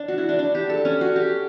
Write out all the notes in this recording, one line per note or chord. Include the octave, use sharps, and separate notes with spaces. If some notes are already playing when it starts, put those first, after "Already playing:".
Already playing: D4
F#4
E4
D4
D4
G4
A4
C#4
F#4
G4